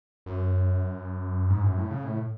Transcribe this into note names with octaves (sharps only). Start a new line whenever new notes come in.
F#2
G#2
F#2
A2
C#3
A2